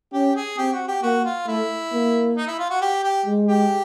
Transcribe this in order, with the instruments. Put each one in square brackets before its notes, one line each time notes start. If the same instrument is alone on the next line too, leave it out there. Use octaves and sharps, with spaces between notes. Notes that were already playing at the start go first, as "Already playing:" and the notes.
[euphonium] C#4 [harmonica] G4
[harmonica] G#4
[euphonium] C4 [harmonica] G4
[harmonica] F#4
G4
[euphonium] A#3 [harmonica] F#4
[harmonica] F4
[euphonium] A3 [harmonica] E4
[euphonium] A#3
[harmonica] D#4
E4
F4
F#4
G4
G4
[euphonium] G#3
[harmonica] G4